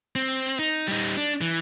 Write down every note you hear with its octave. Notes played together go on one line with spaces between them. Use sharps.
C4
D#4
G3 D#4
D4
E3